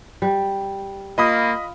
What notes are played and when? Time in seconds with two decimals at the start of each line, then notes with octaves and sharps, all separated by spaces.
0.22 G3
1.18 A#3 F4 D#5 B5 D#6